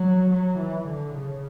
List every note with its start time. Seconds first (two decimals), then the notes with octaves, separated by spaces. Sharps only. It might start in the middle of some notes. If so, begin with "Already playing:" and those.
Already playing: F#3
0.30 F#3
0.59 E3
0.87 D3
1.15 C#3